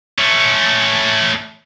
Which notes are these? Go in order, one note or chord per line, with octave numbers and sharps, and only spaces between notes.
A3 C#4